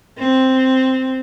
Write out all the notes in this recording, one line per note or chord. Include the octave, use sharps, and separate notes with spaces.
C4